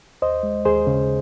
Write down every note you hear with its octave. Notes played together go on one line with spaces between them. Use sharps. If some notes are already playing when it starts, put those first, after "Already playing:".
D#2 C5 D#5
G#3
D#2 G#4 C5
C#3